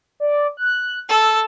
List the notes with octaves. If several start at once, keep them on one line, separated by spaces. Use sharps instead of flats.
D5
F#6
A4 E6